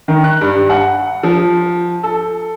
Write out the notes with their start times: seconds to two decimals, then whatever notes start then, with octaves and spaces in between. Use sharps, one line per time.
0.08 D#3
0.24 F#6
0.41 G2
0.70 F#5
1.23 F3
2.03 A4